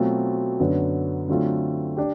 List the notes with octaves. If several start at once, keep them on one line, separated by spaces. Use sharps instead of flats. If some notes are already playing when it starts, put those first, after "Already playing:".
Already playing: B2 F#3 A3 C4 F4
F#2 D3 F#3 B3
D3 F#3 A3 C4 F4
D4 G4